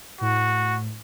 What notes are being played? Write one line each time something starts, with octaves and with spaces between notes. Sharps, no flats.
A2 F#4